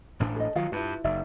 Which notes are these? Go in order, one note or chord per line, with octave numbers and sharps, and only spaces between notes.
A1 A2 D4
A4 D#5
D#3 F#3 F4 F5
G2 E4 F4 B4
F#1 D#4 D5 E5